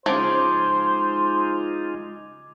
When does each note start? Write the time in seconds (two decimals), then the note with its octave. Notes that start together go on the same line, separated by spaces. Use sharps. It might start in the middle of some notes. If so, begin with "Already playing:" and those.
0.06 C#3 F3 G#3 D#4 F4 C5 D6 G#6